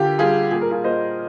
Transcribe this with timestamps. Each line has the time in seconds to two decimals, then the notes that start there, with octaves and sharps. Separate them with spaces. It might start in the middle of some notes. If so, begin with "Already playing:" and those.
Already playing: D3 A#3 F4 G4
0.19 G3 F4 G#4
0.51 A#2 G#4
0.61 A#4
0.71 F4 G#4
0.84 A#2 C5 D#5